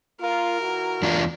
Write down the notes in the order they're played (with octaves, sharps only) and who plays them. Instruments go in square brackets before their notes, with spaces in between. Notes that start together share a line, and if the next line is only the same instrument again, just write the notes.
[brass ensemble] A#3 F4 [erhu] A#4
[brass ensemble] E3 E4 F#4
[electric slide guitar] E2 D4 F4